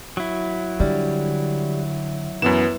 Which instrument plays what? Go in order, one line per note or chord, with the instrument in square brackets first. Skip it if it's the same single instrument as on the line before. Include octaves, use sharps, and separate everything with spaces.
[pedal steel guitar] F#3 E4
[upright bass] D3 [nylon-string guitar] G3
[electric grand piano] F#2 B3 E7 [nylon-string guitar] E3